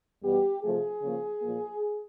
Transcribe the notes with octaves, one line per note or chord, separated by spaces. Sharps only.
E2 B2 G3 B3 G4
C3 F3 A3 G#4
C#3 F3 A#3
A#2 F3 A#3